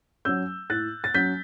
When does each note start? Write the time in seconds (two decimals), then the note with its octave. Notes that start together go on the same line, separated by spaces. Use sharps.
0.25 F#3 C#4 E6 G6
0.70 A2 F#6 A6
1.04 A6
1.14 F#3 C#4 G6 B6